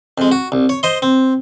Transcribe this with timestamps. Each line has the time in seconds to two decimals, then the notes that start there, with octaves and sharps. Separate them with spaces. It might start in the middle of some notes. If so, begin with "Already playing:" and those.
0.18 F2 G#3
0.32 F#4
0.52 C2
0.69 C#5
0.83 C5 D#5 C6
1.02 C4